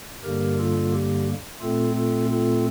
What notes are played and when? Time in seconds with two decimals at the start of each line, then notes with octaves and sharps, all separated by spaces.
0.23 G2 D3 G3 A#3 G4 A#4
0.58 F4 A4
0.92 G4
1.61 A#2 A3 C4 F4 A4
1.95 F4 A4
2.29 F4 A4